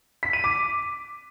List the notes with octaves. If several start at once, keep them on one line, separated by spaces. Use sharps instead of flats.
B6
D#7
D6